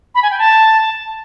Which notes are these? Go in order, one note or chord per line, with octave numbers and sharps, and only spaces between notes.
B5
G#5
G5
A5